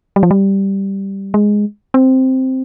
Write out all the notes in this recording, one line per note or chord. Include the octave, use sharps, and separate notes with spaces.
G3
F3
G3
G#3
C4